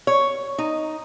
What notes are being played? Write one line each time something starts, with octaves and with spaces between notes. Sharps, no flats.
C#5
D#4